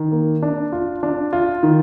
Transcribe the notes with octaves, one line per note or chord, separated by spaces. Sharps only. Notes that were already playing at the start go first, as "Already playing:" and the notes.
Already playing: D#3
A#3
D4
F4
D4
F4
D#3